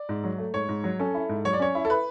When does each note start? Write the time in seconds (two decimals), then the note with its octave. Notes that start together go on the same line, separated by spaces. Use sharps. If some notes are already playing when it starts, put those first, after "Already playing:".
Already playing: D5
0.09 G#2
0.24 F#3
0.38 A3
0.54 G#2 C#5
0.69 G#2
0.84 F#3
0.99 C#4 A4
1.14 E4
1.29 G#2
1.45 F#3 C#5
1.53 D5
1.59 C#4 C#5
1.75 E4
1.85 A4
1.90 B4